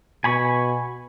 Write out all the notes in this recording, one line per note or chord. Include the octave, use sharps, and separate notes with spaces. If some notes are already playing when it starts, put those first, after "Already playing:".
B2 G#5 B5 C#6